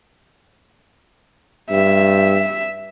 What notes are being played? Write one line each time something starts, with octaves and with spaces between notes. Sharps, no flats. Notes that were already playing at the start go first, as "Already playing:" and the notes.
G2 E5